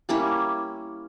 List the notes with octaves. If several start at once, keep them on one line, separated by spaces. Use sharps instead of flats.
G3 A#3 C#4 E4